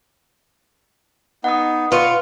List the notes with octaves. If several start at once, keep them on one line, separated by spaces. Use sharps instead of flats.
B3 D#4 F#5 D#6
F4 B4 C#6